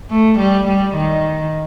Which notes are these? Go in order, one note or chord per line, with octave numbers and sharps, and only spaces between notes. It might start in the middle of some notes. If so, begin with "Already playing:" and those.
A3
G3
G3
D#3